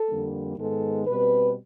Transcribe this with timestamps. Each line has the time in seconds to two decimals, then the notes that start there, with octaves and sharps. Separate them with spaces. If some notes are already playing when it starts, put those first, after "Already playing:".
Already playing: A4
0.08 F2 D3 G3 A#3
0.58 G#2 D#3 G#3 B3 A4
1.07 B2 G3 C4 B4